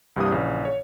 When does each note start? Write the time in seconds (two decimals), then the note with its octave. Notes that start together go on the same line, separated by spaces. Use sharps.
0.16 C2 G2 C3 E3 A#3 D#6
0.31 A#1 C#3 E3
0.65 C#5